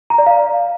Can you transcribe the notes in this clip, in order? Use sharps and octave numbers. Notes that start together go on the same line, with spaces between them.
A#5
D5
F5